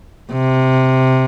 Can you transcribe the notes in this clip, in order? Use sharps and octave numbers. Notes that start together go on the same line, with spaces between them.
C3